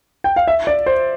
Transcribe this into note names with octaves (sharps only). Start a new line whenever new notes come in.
G5
F5
E5
D5
C5